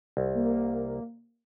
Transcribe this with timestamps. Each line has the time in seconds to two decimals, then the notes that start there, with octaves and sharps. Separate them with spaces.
0.17 C2
0.34 A#3